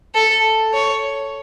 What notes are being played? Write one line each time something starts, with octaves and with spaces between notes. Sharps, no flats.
A4
C#5